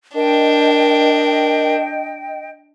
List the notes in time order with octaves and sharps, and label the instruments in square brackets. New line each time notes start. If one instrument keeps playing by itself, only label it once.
[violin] D4 [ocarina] A#4 [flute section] D#5 G5